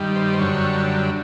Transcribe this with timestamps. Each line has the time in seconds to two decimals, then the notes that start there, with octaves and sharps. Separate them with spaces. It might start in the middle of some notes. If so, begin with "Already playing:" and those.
Already playing: G2 D#3 G3
0.16 C5
0.33 C5
0.39 F#2 D3 G3 C#5